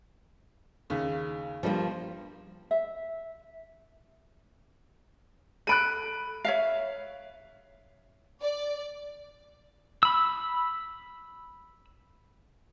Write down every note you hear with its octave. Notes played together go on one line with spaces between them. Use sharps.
D#2 C#3
G2 F3 G3 A#3
E5
A4 B5 F#6 D7 D#7
C#5 E5 F5
D5
B5 E6